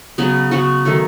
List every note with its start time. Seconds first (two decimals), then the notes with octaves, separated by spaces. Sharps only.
0.18 C#3 F#3 B3
0.51 C#3 F#3 B3 F#4
0.85 D#3 F#3 A3